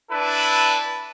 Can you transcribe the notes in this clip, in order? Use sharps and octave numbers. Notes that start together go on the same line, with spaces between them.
D4 E4 A4 B4